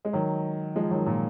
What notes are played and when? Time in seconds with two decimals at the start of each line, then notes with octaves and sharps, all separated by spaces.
0.05 G#3
0.13 D#3 F#3
0.75 F3 G#3
0.91 D#3 F#3
1.06 A#2